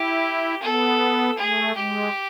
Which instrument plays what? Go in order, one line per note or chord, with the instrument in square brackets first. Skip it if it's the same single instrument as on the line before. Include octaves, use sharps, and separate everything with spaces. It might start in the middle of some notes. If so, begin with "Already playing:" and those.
Already playing: [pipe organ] E4 [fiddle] G4
[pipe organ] B3 [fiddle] A4
[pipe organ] A3 [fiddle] G#4
[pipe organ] G#3 [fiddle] G4